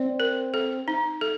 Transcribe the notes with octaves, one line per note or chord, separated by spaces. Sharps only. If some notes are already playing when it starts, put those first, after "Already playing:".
Already playing: C4 D5
A#4
A4
D#4
A4